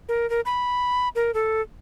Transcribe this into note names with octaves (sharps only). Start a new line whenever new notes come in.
A#4
A#4
B5
A#4
A4